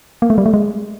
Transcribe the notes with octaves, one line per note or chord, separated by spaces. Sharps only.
A#3
A3
G3
A3
G#3